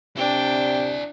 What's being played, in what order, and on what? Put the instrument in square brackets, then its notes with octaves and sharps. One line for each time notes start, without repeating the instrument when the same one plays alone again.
[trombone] C3 [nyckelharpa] D4 [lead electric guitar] E4 D5 [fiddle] G5